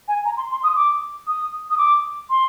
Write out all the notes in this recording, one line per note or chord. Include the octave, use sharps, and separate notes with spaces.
G#5
A#5
C6
C6
D#6
D6
D#6
D#6
D6
C6